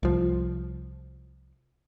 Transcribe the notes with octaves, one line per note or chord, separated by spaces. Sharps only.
C2 F3